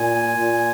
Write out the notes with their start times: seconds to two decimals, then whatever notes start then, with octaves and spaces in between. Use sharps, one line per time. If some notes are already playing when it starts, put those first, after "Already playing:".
Already playing: A#2 G#5
0.38 A#2